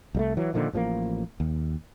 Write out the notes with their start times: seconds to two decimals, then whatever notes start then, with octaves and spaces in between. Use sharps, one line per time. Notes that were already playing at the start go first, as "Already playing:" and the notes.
0.15 C2 G3 A3
0.37 E3 F#3
0.54 A#2 D3 D#3 F3
0.73 A1 F3 G3 A#3
1.40 D#2